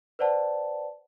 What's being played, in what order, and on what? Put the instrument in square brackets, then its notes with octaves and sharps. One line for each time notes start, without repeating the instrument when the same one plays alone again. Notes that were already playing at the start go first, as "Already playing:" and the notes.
[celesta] B4 C5 D5 F#5 A5